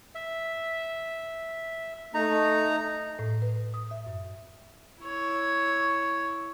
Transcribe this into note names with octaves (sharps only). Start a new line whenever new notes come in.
E5
A3 D#4 A#5
A2
B4
D#6
E5
F#2
E4 C#5